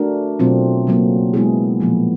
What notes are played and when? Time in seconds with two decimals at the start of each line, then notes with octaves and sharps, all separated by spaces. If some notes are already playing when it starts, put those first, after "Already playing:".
Already playing: A3 D4 F#4 A#4
0.39 B2 F#3 A3 C4 F4
0.87 C#3 F#3 A#3
1.34 G#3 B3 E4 G#4
1.80 A#2 F3 A#3